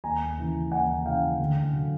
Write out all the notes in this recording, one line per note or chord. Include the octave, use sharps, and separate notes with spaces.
D#2 G#5 A#5
C#3 E3
D#2 F#5 G#5
C#3 E3 F5 G5
D2
D3 F#3